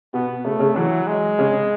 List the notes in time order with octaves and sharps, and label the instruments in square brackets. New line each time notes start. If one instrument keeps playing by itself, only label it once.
[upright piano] B2 [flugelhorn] B3
[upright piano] C#3 [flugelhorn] A3
[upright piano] C#3
[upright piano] E3 [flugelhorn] F#3
[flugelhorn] G#3
[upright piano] C#3